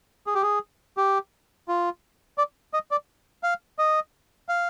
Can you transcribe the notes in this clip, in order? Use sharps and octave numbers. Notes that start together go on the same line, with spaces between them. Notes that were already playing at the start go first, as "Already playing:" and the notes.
G#4
G4
G#4
G4
F4
D5
D#5
D5
F5
D#5
F5